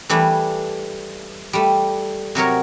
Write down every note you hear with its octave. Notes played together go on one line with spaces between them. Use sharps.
E3 G3 A3 D4
G3 A3
C3 F#3 A#4 C#5